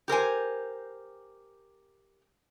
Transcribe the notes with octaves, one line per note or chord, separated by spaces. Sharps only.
G4 A#4 C5 G#5